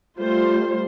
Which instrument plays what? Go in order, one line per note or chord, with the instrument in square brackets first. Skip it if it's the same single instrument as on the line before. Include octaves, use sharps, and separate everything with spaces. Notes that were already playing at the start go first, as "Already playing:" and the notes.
[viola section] G3 A3 F4 C5